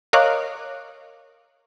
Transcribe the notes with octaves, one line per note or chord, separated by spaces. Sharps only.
A#4 C#5 D#5 F5 D6 F#6